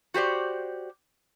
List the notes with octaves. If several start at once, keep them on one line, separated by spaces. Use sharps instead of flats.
F#4 G4 C5 D5